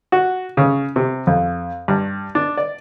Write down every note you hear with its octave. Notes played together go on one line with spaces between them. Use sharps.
F#4
C#3
C3
F2
G2
D4
D5